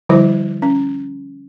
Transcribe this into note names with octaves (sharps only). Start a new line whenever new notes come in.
D3 F3 G3 E4 C5
C#4